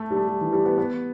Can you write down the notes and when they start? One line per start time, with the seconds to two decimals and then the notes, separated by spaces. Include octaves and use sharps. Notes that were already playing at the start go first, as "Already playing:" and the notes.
Already playing: A3
0.11 G3
0.16 A3
0.28 G3
0.41 E3
0.53 G3
0.65 B3
0.78 B3